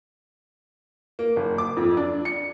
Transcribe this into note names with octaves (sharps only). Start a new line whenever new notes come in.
A#3
F#1
D6
F2
D4
C#7